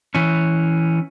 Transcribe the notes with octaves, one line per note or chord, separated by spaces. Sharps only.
E3 C#4